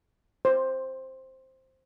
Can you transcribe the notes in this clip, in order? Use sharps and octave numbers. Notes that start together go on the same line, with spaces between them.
C5